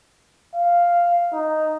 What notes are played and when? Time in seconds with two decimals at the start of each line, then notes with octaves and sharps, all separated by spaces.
0.55 F5
1.33 D#4